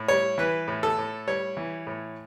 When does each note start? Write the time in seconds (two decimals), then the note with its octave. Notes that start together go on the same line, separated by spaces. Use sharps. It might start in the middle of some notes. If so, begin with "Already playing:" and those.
Already playing: A2
0.08 G3 C#5
0.38 E3 B4
0.68 A2
0.83 A4
0.98 A2
1.27 G3 C#5
1.57 E3
1.87 A2